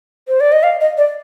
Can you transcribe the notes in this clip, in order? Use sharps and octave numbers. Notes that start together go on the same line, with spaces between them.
C5
D5
D#5
F5
D#5
D5